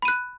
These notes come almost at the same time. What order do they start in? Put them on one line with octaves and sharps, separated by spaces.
B5 D#7 F#6